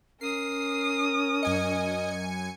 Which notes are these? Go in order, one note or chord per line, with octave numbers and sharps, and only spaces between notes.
C#4 A#4 D#6 C7
F#2 D#5 G#5 C#7